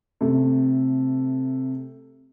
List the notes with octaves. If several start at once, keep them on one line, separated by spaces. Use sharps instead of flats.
C3 A3